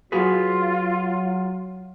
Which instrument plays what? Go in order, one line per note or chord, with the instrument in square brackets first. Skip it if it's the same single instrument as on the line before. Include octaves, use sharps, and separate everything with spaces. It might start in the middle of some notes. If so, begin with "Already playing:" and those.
[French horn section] F#3 [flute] F4 [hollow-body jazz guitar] F#4 G#4 B4